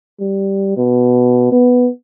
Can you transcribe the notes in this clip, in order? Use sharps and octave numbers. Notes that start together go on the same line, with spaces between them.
G3
B2
B3